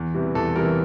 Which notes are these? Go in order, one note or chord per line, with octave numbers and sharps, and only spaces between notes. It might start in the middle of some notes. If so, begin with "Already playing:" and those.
Already playing: E2
C3 E3 G3
E2 A4
C3 E3 G3 A#4